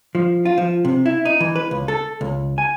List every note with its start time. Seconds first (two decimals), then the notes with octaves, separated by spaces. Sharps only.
0.15 F3
0.45 F4
0.58 F3
0.85 C3
1.06 E4
1.25 D#4
1.40 E3
1.56 B4
1.71 C#2
1.88 A4
2.21 C#2
2.58 G#5